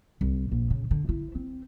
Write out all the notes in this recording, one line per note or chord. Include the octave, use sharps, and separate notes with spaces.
C2
A#1
C#3
D3
E4
C4